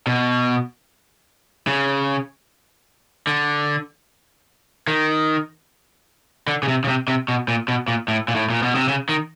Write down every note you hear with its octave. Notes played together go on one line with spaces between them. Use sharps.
B2
C#3
D3
D#3
D3
C#3
C3
C#3
C3
C3
B2
A#2
B2
A#2
A2
A#2
A2
A#2
B2
C3
C#3
D#3